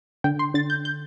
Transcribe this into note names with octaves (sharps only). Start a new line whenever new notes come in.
D3 G5
C6
D3 A6
G6
G6